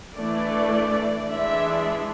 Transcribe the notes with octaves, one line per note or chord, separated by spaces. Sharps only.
E3 A3 D4 D5
E3 G#3 D4 E5